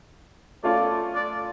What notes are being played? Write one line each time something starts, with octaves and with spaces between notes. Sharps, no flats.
A3 C#4 F4 A4 C#5 D5
D5